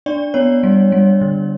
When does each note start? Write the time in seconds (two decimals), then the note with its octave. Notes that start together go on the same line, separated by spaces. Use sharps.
0.06 D4 D5
0.34 B3 C#5
0.63 G3
0.92 G3
1.21 D3